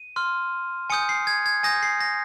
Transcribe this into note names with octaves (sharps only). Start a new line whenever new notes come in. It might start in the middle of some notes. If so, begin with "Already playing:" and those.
Already playing: D#7
C6 F6
G#5 D#6 G6 C#7
C7
G#6
G#6
G#5 D#6 G6 A#6
C7
A#6